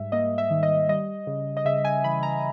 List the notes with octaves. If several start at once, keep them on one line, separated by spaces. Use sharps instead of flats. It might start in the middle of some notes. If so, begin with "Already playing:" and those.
Already playing: G#2 G3 E5
A#3 D#5
E5
D#3
D#5
G3 D#5
C#3
D#5
C#3 E5
G#5
E3 B5
A#5